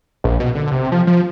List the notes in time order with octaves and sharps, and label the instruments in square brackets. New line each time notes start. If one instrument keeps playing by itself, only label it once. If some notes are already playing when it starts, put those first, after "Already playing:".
[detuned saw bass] A#1
B2
D3
C3
F3
F3